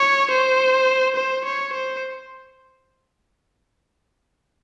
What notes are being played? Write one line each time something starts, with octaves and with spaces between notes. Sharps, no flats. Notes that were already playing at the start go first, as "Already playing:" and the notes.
Already playing: C#5
C5
C5
C#5
C5